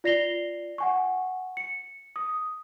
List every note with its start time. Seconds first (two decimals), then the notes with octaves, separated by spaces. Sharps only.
0.04 F4 D5 A#6 C7 F7 G7
0.78 F#5 G#5 C#6
1.57 C#7
2.16 D#6